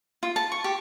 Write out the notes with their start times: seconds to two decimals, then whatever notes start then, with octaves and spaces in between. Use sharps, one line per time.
0.23 F4
0.36 A5
0.52 C#6
0.64 G4